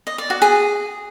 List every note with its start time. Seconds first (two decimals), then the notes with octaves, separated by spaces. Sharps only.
0.07 D#5
0.18 D5
0.30 F#4
0.42 G#4